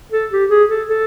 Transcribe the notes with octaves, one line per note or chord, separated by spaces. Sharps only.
A4
G4
G#4
A4
A4